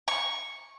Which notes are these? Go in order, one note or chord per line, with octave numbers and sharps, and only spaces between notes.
C#6